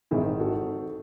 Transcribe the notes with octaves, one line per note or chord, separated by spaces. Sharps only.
G#1 G#2 D#3 E4 G#4
F#4 A4